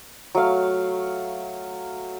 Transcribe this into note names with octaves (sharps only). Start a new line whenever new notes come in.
F#3 A3 F5